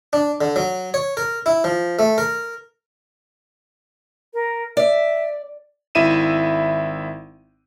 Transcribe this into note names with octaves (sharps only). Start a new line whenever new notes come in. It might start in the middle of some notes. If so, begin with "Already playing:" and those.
D4
D3
F#3
C#5
A#4
E4
F3
A3
A#4
A#4
D5 E5
G#1 E4 E5 D#7 E7